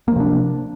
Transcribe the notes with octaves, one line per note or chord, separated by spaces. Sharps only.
C3 F3 A#3 D4